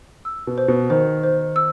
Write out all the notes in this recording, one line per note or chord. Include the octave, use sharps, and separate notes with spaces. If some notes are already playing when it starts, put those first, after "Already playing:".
E6
B2
C5
B2
D#3 C5
C5
E6